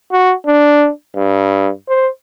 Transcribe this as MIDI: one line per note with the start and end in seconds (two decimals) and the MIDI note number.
0.12 0.33 66
0.47 0.90 62
1.16 1.70 43
1.89 2.08 72